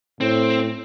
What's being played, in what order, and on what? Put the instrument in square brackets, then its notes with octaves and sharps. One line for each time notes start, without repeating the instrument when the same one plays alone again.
[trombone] A2 [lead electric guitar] C4